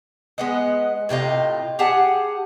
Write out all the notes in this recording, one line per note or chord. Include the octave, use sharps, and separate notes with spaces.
G#3 B3 D#5
A2 C3 F4 D#5
G4 G#4 F#5 A5